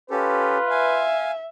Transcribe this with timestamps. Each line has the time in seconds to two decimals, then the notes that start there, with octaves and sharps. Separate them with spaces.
0.11 C#4 F4 G4 A4 B4
0.70 E5 F5 G#5